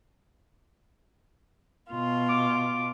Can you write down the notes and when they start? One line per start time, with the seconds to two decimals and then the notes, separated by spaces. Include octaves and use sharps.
1.91 B2 F4
2.29 D6